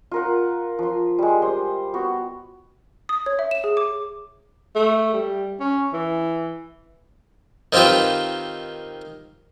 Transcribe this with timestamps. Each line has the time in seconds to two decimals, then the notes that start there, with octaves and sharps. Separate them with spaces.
0.11 F4 A#4 F#5
0.79 F3 C6
1.19 G3 G#3
1.42 G4 C5 C6 D#6
1.94 B3 F#4
3.09 D#6
3.26 C#5
3.39 E5
3.51 E7
3.64 G#4
3.77 D6
4.75 A3
5.14 G3
5.60 C#4
5.94 E3
7.73 D#3 C4 F4 G4 B4